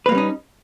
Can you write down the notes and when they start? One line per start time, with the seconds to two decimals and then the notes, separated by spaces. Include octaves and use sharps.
0.06 B4
0.09 A#3
0.12 G3
0.15 C#4
0.18 D#4